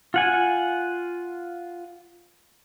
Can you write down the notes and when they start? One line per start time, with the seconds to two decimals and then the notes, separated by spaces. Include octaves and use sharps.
0.14 F4 F#5 G#5